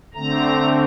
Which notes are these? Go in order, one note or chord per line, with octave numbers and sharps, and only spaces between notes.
D3 A3 C4 A#5